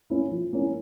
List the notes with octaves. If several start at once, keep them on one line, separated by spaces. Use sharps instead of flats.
A#3 C#4 E4
F3
A#3 C#4 E4